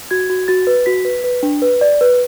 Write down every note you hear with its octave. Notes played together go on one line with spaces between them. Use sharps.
F#4 G#6
F#4
F#4 A6
B4
F#4 B6
B4
B4
D4
B4
D5
B4